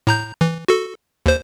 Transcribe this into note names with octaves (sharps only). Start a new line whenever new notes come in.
A2 A#5 G6
E3
F#4 A4
D#2 C5